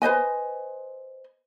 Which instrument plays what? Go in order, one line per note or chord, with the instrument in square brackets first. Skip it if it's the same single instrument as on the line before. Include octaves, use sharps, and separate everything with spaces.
[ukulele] B4 C5 D#5 G#5